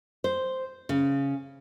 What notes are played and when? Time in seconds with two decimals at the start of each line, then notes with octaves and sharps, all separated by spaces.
0.24 C5
0.89 C#3